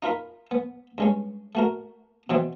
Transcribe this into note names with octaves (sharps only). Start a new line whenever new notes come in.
D#4 F4 A#4 B5
B3
G2 G#3 C#4
A3 F#4 A#4
B2 E3 B3 C4